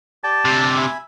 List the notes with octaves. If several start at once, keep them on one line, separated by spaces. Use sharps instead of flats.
G4 D5 G5 A5
D2 C3
E5 G#5 B5